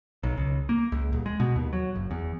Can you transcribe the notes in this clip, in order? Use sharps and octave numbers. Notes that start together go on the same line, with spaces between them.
B1
C#2
A#3
C#2
D#1
G#3
B2
D#2
F#3
F#1
E2